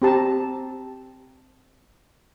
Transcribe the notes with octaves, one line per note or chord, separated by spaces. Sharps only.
C4 G4 A5 A#5